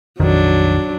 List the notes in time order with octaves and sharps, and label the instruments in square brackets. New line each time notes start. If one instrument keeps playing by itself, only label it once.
[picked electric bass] A#1 F2 D#3 [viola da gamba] F#3 D4